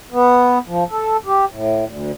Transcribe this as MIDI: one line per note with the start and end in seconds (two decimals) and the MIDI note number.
0.12 0.58 59
0.68 0.84 53
0.90 1.17 69
1.26 1.45 67
1.52 1.85 45
1.85 2.12 38